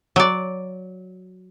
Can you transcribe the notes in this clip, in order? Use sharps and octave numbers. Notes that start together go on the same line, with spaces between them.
F#3 D5